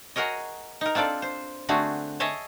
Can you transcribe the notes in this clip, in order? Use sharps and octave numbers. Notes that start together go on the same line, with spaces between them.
F#4 G#4 A#4 C#5 D#5
D#4 A#4
C4 D4 F4 A4 D5
C5
D3 A3 C4 D4 F#4 G#4
G#4 C#5 D#5 E5 G#5 A5